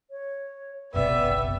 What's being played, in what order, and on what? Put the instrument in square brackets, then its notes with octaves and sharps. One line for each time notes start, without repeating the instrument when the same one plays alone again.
[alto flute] C#5
[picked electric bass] F#1 B1 C3 [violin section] B3 G4 [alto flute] D5 [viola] E5